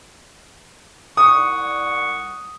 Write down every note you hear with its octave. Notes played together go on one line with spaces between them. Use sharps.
C2 F#5 C#6 D#6